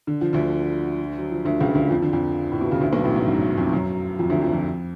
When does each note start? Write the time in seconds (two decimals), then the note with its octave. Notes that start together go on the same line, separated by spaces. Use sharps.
0.07 D3
0.21 F3
0.33 D2 D3
1.18 F#3
1.32 F3
1.45 D2 D3
1.60 C#2 C#3
1.75 D2 D3
1.90 F2 F3
2.02 D3
2.13 F2 F3
2.52 A2
2.61 B2
2.71 C#3
2.81 D2 D3
2.93 B1 B2
3.04 A1 A2
3.16 G#2
3.27 F#2
3.57 F2 F3
3.73 F#2 F#3
4.19 F2 F3
4.30 D2 D3
4.41 F2 F3
4.53 F2 F3